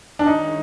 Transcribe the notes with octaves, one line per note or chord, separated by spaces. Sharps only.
D4
D#3 G#3 C#4 D#4 E4